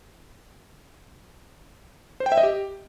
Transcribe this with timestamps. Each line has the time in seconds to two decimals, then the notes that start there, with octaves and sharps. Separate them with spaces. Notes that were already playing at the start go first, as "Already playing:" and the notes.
2.20 C5
2.26 G5
2.32 E5
2.38 D#5
2.43 G4